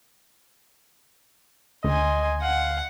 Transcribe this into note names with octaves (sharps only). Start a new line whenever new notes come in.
D2 D#5 G#5 C6
F5 F#5